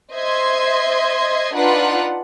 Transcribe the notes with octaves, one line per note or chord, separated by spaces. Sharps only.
C5 D#5 E5 C6 G#6
D4 D#4 F4 B4 F#5